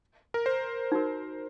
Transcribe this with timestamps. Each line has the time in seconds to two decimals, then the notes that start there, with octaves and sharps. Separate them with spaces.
0.34 A#4
0.46 C5
0.92 D#4 F#4 A#4